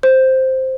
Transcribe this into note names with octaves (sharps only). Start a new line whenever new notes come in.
C5